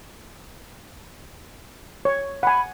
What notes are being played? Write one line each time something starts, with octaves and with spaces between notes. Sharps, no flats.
C#5
F#5 G#5 B5